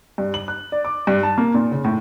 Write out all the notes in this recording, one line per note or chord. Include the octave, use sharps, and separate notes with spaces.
G2
F#7
F#6
D5
D6
G2
A5
A#3
A#2
C#3
A2